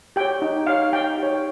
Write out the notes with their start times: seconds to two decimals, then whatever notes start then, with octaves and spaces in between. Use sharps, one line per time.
0.16 G4 C#5 G5
0.42 D#4
0.67 G4 C#5 F5
0.92 D#4 G5
1.18 G4 C#5